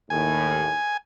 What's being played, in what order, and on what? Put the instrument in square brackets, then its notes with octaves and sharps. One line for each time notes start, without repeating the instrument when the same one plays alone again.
[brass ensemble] D#2 A2 [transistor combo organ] G#5